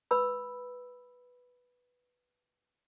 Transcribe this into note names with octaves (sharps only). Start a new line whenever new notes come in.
B4 B5 E6